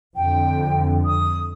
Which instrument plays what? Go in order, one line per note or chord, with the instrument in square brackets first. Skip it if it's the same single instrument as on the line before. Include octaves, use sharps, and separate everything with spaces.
[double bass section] F2 D3 [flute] G5
[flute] D#6